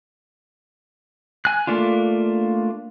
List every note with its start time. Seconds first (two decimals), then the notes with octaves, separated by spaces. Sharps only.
1.45 G#5 F#6
1.67 A3 A#3 D4 F4